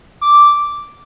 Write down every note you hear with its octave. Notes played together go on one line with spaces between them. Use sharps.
D6